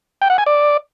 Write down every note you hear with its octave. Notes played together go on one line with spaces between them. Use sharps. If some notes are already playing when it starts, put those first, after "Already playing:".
G5
F#5
G#5
D5